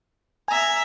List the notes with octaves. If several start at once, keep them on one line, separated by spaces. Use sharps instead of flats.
E5 G#5 A#5